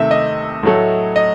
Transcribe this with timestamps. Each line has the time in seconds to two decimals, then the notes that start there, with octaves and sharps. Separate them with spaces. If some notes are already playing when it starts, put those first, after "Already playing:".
Already playing: C3 D#3 A3 E5
0.11 D#5
0.63 A2 F#3 A3
1.16 D#5